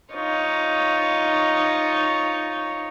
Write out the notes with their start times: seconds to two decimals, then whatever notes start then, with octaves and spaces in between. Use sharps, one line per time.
0.14 D#4 F4 C#5